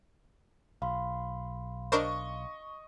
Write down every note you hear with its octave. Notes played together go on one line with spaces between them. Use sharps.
B1 F5 B5 C6
D4 A#4 C5 D#5 C#6